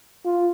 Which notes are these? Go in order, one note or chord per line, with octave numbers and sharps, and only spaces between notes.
F4